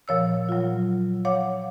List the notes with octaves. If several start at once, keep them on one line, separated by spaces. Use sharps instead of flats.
A#2 F3 C#5 E6
F#3 F4
C#5 F5 F#5 D6